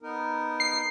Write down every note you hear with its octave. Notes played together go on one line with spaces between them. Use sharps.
B3 D#4 A#4
C7